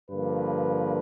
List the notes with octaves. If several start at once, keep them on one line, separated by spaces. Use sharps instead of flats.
G2 D3 F3 A#3 B4